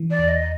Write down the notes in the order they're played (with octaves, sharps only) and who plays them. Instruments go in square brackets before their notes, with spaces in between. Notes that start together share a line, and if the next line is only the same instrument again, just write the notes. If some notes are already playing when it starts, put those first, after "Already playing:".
Already playing: [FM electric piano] E3
[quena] D5
[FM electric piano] E2
[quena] D#5
D#5